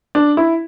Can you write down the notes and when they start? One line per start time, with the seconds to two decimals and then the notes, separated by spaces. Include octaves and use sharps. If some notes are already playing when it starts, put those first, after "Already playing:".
0.15 D4
0.37 E4